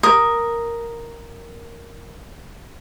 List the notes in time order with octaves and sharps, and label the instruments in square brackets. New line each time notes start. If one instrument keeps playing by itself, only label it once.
[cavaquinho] A#4 D#6